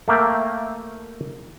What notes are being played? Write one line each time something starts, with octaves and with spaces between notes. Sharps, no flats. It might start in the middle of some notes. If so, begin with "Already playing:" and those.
A3 A#3 E5 G5